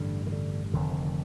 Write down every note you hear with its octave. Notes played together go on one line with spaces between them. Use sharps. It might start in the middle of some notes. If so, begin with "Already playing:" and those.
Already playing: A1 G2 D3
D#3
D3
F1 F2 D3 D#3